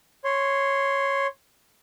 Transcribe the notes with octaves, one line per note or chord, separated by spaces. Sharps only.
C#5 C6